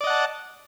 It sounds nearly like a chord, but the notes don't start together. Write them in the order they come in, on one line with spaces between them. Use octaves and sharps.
D5 D#5 F#5 A5